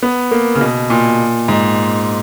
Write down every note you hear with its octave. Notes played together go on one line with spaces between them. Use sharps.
B3
A#3
C#3
B2
A#2
G#2